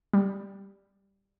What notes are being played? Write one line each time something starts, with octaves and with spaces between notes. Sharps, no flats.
G3